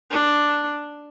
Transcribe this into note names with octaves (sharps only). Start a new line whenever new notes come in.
D4